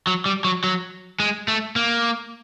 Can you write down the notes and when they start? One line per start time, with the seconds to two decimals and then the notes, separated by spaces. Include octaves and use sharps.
0.07 F#3
0.26 G3
0.44 F#3
0.64 F#3
1.20 G#3
1.48 A3
1.76 A#3